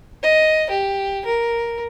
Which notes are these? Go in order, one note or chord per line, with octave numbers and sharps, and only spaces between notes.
D#5
G4
A#4